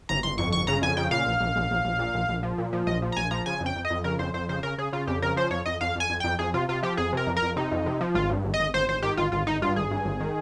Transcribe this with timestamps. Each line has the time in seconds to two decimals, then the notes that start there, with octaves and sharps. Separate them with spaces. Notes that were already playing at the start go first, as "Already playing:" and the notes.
0.09 G1 A#5
0.23 G1 C6
0.38 F2 C#6
0.52 G1 C#6
0.67 C#3 A#5
0.82 F2 G#5
0.97 C#3 G5
1.11 A#2 F5
1.26 A#1
1.40 A#1
1.56 A#1
1.71 A#1
1.85 A#1
1.99 A#2
2.15 A#1
2.29 A#1
2.43 F3
2.58 A#2
2.73 F3
2.87 A#1 D#5
3.02 F3
3.12 A#5
3.17 A#1 G#5
3.31 F3 A#5
3.46 C#3 G#5
3.60 F2
3.66 G5
3.76 F2
3.85 D#5
3.90 F2
4.04 C#3 A#4
4.19 F2 C5
4.34 F2 C5
4.49 C#3 C5
4.63 C#3 A#4
4.78 C#3 G#4
4.92 C#3 F4
5.07 F2 G4
5.22 C#3 A#4
5.36 F3 C5
5.51 F2 C#5
5.66 F2 D#5
5.81 F2 F5
5.96 F2 G#5
6.10 F2
6.20 F2 G5
6.39 F2 G#4
6.54 C3 F4
6.69 C3 F4
6.83 F3 G4
6.97 F2 G#4
7.13 C3 A#4
7.27 F2
7.37 A#4
7.42 F2
7.56 C3 D#4
7.71 F2
7.86 C3
8.01 F3
8.15 G#1 F4
8.30 G2
8.45 G#1
8.54 D#5
8.60 G#1
8.74 G#1 C5
8.88 G#1 C5
9.02 D#3 G4
9.17 G#1 F4
9.32 G#1 F4
9.47 G#1 D#4
9.62 G2 F4
9.76 G#1 G#4
9.91 G2
10.05 G#1
10.20 D#3